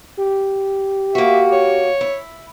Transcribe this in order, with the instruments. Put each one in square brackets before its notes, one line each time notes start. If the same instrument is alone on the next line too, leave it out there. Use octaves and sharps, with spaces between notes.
[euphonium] G4
[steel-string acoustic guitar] A#3 F#4 [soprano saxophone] E5
[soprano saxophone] C#5
[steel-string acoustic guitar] E4